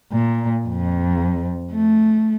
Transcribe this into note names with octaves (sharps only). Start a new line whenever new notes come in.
A#2
F2
A3